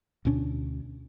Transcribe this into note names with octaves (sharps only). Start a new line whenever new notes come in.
D2 B2 C#4 D4